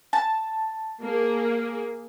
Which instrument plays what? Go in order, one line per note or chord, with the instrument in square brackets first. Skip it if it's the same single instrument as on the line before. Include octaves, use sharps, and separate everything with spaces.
[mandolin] A5
[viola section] A#3 G#4